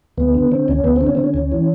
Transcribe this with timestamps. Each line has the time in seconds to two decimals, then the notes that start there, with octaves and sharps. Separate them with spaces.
0.17 D2 B3
0.35 D3
0.52 D3 C4
0.68 D2 C#4
0.84 D2 B3
0.96 D3 C4
1.07 C#4
1.15 D3 C4
1.24 C#4
1.34 D2
1.52 E3